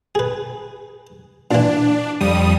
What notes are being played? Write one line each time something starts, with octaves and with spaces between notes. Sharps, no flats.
G#4 B4
A#2 E3 D4
F2 G3 D#6